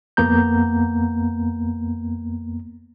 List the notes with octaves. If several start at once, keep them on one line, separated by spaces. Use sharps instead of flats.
F2 A#3 B3 A#5 G6